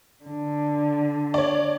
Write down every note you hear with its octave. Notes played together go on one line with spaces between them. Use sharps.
D3
C#5 D5